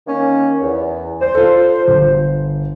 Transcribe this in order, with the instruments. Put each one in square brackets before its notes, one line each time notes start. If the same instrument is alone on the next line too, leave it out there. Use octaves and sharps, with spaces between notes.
[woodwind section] D#3 A#3 C#4
E2
[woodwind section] C5 [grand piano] D5
[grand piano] F4 A4
G1